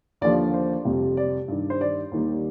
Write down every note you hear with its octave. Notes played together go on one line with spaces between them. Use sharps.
D#2 D3 F3 D5
C5
F2 C3 G3
D5
G2 D#3 G3
C5
D5
D#2 D#3 G3